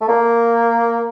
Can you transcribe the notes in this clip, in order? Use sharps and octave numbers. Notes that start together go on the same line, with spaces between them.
A3
A#3